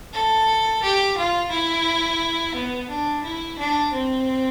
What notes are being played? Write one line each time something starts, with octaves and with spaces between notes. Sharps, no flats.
A4
G4
F4
E4
B3
D4
E4
D4
C4